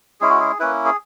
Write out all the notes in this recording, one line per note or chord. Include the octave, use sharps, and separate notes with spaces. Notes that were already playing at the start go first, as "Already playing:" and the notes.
G#3 C#4 E4 G#4
F#4
G#4
A#3 C#4 E4 B4
G#4